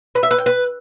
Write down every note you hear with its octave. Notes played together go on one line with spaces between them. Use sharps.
B4
E5
B4
G5
B4